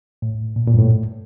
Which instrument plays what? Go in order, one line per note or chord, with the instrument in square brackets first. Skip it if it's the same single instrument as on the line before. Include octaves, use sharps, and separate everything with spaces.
[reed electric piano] A2
A#2
A#2
G2
A2